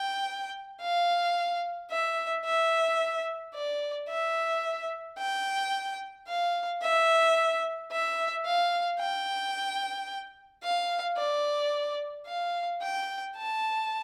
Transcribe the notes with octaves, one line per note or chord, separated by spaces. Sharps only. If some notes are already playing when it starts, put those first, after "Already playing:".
Already playing: G5
F5
E5
E5
D5
E5
G5
F5
E5
E5
F5
G5
F5
D5
F5
G5
A5